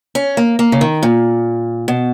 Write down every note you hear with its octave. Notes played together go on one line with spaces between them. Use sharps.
C#4
A#3
A#3
C#3
D#3
A#2
B2